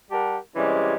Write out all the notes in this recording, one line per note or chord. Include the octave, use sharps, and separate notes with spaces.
G3 G4 A#4 F#5 A5
C3 E3 G3 G#3 C#4